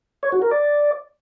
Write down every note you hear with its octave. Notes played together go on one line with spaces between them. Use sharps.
C#5
F#4
A#4
D5